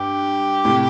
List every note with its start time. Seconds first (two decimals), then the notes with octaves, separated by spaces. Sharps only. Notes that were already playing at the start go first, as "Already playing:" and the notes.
Already playing: G2 G4
0.65 A2 C3